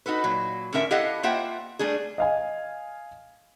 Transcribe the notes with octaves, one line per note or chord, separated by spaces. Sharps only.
D#4 F#4 A4 B4
A#2 F#3
A2 D3 C#4 A#4 E5
E4 G4 A4 D#5 F5 F#5
A#3 F4 C5 E5 F#5 G5
G3 A3 D4 G#4
D#5 F5 G#5